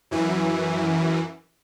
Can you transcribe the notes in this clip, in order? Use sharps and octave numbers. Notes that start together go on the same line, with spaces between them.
F#2 E3